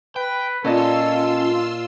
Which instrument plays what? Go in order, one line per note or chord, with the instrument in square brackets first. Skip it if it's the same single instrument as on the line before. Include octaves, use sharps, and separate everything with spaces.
[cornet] B4 [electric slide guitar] G5
[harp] A#2 D#5 A5 [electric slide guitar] C#4 [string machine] F4 C6 E6 [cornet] A4